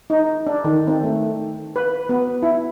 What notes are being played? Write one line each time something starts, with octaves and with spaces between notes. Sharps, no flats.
D#4
D4
D#3
C4
A3
B4
B3
E4